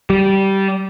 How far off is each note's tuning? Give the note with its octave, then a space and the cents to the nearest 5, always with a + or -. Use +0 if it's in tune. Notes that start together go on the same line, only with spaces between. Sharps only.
G3 -15